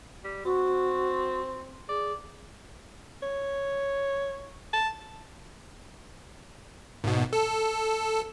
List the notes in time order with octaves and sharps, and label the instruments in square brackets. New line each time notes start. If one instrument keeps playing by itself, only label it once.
[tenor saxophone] G3
[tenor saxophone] C4 [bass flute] F#4
[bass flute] G#4 [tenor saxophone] D5
[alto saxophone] C#5
A5
[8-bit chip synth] G#1 B2
A4